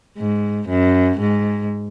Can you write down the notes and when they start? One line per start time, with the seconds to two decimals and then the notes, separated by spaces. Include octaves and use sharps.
0.18 G#2
0.69 F#2
1.20 G#2